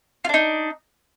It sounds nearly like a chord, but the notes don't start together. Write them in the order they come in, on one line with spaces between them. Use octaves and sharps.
F4 D4 D#4